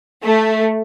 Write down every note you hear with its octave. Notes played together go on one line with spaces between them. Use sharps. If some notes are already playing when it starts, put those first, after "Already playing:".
A3